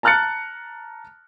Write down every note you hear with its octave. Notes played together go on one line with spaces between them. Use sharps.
A5 A#5 F6 F#6 A6 C#7